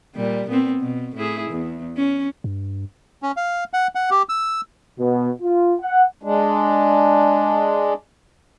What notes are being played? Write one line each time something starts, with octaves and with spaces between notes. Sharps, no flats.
A#2 G3
A#2 B3 C4
B2
A2 E4 G#4
E2
C#4
G2
C#4
F5
F#5
F#5
G4
E6
B2
F4
F#5
G#3 D4